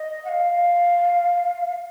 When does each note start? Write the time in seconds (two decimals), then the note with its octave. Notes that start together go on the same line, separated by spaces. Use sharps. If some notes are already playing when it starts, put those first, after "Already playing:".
Already playing: D#5
0.25 F#5
0.29 F5